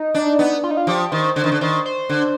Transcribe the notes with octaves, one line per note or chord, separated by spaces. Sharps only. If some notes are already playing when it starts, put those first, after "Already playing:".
Already playing: D#4
D4
B3
F4
D#4
F4
F3 G4
D#3 C5
D3 C5
D#3
D3
D#3 C5
C5
D3